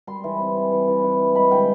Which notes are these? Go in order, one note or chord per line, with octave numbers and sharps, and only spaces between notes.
G3 C6
E3
C4
E3
E3
E3
E3
G3
G#3 B5
D3 G5